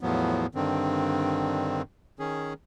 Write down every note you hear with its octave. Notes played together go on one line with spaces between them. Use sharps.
E2 A2 F3 F#3 B3
G2 D3 D#3 C4
D#3 C#4 G#4